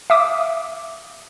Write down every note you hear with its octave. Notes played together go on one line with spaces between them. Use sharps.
E5 F5 D6 D#6